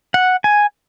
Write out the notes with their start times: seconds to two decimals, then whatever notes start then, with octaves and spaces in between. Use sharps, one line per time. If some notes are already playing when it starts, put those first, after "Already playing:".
0.14 F#5
0.44 G#5